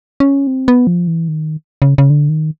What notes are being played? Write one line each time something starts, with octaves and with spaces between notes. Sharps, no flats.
C#4
C4
B3
F3
E3
D#3
C#3
C#3
D3
D#3